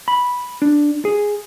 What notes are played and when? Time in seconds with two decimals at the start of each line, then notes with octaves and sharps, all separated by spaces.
0.08 B5
0.62 D4
1.05 G#4